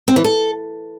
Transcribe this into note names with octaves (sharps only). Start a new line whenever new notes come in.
C4
E3
A4